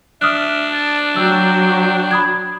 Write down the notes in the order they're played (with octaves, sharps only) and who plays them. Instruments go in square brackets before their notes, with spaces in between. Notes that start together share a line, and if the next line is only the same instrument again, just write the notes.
[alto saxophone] D4 [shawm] E5 [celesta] D#6 F6 F#6
[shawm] A5
[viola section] F#3 [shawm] G5 [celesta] E6
[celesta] B5 D#6 G#6